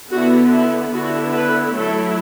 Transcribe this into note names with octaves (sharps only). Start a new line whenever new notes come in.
D3 B3 E4 F#4
E4
D3 B3 E4 F#4
B4
F#3 A3 E4 A4